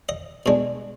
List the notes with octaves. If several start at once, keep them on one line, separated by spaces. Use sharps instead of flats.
D#5
B2 G#3 D4